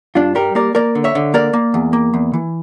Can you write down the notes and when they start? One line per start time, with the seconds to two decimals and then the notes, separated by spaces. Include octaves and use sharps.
0.15 G2 D4 F4
0.35 G3 G4 A#4
0.55 A#3 A#4 D5
0.75 A#3 A#4 D5
0.95 D3
1.04 C#5 E5
1.15 D3
1.34 A#3 A#4 D5
1.53 A#3
1.74 E2
1.93 A#3
2.14 E2
2.34 E3